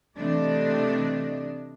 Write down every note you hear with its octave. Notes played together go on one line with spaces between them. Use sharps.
C3 E3 A3 D4 D5 D#5